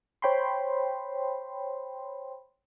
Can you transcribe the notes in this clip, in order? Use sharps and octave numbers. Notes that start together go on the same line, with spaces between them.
C5 C#5 G5 B5 C6